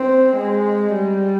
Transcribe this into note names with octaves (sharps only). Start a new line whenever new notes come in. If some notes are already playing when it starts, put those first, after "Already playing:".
Already playing: C4
G#3
G3